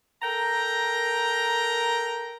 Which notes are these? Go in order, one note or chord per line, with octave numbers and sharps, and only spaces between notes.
A4 A#4 G5 A#5